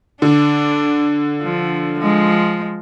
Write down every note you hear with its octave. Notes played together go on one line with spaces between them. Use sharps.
D3 D4
F3
F3 G#3